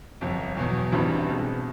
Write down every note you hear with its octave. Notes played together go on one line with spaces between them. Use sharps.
G1 F2 C3
E2 B2 F#3
A1 G2 E3 G3 C4
C2 B2 G#3